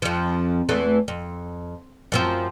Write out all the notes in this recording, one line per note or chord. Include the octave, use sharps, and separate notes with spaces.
F2 F3
E2 E3 A3
F2
F#2 F3 C4